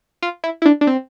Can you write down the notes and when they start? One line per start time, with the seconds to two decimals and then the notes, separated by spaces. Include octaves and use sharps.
0.22 F4
0.44 E4
0.62 E4
0.66 D4
0.81 D4
0.87 C4